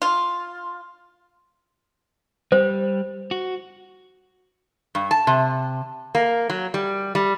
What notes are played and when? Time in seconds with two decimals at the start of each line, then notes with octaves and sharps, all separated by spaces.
0.02 F4
2.52 G3 C5
3.31 F#4
4.95 G2
5.11 A5
5.27 C3
6.15 A#3
6.50 F#3
6.74 G3
7.15 G3